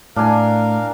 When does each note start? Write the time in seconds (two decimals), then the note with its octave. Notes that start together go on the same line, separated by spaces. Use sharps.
0.16 A2 D4 A#4 F5 G#5